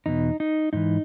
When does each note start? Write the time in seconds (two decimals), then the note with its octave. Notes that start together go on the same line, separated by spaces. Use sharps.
0.06 E2 B2 D#4
0.40 D#4
0.73 G#2 E3 D#4